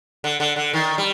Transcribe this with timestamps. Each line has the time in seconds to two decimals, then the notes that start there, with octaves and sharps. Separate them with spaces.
0.24 D3
0.40 D3
0.56 D3
0.73 D#3
0.98 G3